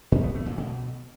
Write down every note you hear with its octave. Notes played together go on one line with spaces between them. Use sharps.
A2
B3
A3
A#2
B2